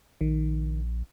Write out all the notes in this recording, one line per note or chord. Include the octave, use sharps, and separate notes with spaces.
A#1 D#3